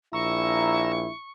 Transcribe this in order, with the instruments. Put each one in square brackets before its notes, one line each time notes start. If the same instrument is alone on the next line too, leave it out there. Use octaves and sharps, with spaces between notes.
[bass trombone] A#1 [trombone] E4 [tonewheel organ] A#5 E6 [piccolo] C#6